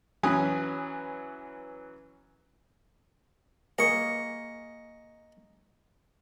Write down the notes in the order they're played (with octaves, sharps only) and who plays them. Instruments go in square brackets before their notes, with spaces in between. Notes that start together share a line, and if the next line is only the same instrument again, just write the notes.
[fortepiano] E3 F#3 C#4 B4 G#5 D#6
[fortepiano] A#3 G#4 [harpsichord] D#5 C#6